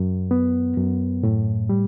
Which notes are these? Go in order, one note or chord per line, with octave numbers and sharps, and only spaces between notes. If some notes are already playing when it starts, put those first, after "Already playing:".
Already playing: F#2
B3
F#2
A2
G3